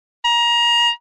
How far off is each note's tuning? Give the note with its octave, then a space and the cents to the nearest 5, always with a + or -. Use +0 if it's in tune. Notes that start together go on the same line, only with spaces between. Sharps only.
A#5 +25